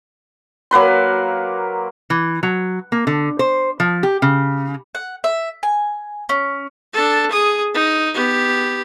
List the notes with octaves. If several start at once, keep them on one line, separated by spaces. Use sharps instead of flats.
F#3 A#3 B4 C6
E3
F#3
A#3
D3
C5
F3
G4
C#3
F#5
E5
G#5
C#4
D4 A4
G#4 D#6
D#4
B3 G4